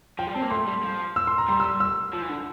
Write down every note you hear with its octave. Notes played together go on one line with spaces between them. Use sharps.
F3 G5
G3
C4 A5
A#3
A3 C6
G3
F3
E6
C6
A#5
G3 C6
E6
E6
F3
E3
D3